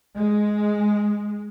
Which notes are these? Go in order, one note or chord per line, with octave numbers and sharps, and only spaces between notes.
G#3